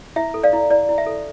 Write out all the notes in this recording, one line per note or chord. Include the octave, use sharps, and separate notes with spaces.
E4 E5
A4
D5 F5
E4
E4 D5
E4
E5
A4